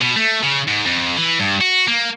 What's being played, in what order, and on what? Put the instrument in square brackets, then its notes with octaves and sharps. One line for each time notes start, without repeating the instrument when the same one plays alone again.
[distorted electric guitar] B2
A3
C#3
G#2
F2
E3
G2
F#4
A#3